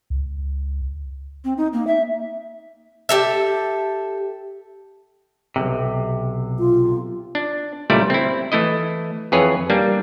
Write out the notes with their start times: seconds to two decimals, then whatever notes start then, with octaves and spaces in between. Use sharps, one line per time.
0.10 C#2
1.45 C4
1.58 D#4
1.73 A#3
1.87 E5
3.09 G4 A4 E5
5.56 B1 F2 C3
6.59 F4
7.35 D4
7.90 C#2 A#2 G3 A3 E4 D5
8.10 C4 E4
8.52 E3 A3 E4 D#5
9.32 F2 E3 G#4 B4 C#5
9.70 G3 A#3 D4